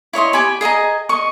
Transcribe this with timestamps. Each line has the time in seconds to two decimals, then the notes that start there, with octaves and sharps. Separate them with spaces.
0.13 E4 C#5 D#5 C6
0.33 G4 G#5 B5
0.61 G#4 D#5 G#5 A#5
1.09 D#5 C#6